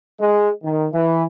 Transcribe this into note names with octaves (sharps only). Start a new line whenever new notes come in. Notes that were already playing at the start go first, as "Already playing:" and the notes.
G#3
D#3
E3